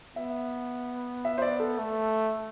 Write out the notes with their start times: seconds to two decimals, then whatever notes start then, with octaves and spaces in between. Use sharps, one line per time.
0.16 B3 E5
1.25 E5
1.38 C5
1.42 D5
1.60 A4
1.78 A3